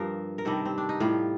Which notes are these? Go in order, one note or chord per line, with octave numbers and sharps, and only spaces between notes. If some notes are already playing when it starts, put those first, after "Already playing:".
Already playing: G2 F3 A#4
A#4
C3 D#3 G3 A4
C4
D4
D#4
A2 G3 F4